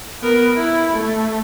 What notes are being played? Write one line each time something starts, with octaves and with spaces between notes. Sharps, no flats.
B3 A#4
E4
A3